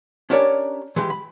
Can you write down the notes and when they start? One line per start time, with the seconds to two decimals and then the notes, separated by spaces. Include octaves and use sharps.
0.30 C#4 D4 G4 A#4 C#5 D5
0.96 E3 G#3 G4
1.10 B5